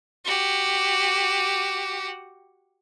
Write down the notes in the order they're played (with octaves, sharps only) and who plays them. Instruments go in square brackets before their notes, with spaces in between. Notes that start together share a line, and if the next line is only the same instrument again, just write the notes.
[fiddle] F#4 G4